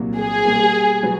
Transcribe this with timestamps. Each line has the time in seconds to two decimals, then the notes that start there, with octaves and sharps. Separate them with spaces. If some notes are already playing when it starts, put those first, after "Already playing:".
Already playing: C2 A#2 F#3 A#3
0.17 G#4
0.45 B2 G3 A#3
1.03 B2 F#3 B3